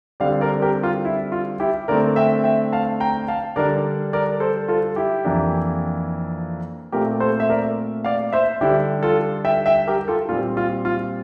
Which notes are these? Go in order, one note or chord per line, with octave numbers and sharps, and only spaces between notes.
D3 G3 C4 D5 F5
A#4 D5
G4 A#4
F4
E4
F4
E4 G4
D3 A3 C4 A#4 D5
E5 G5
E5 G5
F5 A5
G5 A#5
F5 A5
D3 G3 D4 A#4 D5
A#4 D5
A4 C5
F4 A4
E4 G4
F2 E3 A#3 D4
A#2 A3 C4 G4 A#4
A4 C5
E5
A#4 D5
D5 F5
C5 E5
D3 G3 D4 E4 G4
F4 A4
E5 G5
E5 G5
G4 A#4
F4 A4
A#2 G3 C4 F4
F4
F4